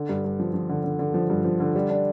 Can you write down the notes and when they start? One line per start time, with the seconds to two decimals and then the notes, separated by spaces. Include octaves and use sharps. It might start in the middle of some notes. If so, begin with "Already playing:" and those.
Already playing: D3
0.09 G2
0.25 G2
0.40 F3
0.54 F3
0.69 D3
0.84 D3
0.99 D3
1.14 F3
1.30 G2
1.44 F3
1.60 D3
1.75 G3
1.90 D4